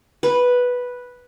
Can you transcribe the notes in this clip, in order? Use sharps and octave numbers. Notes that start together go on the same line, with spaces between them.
B4